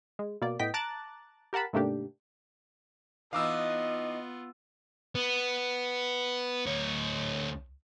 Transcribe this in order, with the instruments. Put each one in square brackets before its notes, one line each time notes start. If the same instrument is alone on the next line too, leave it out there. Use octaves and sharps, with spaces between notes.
[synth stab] G#3
B2 A#3 D5
A2 B3 D#5 G5 B6
A5 A#5 D6 F#6 A6
G4 A#4 F#5 A5 B5
G#2 C3 A3 A#3 D4 G4
[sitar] E3 D#4 [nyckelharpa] B3 F4 [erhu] D#5 [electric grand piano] F5 D6 E6
[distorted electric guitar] B3
D2 C#5